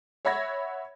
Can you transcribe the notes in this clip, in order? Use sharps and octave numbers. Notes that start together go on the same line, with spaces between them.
C#5 E5 F#5 B5 G#6 A#6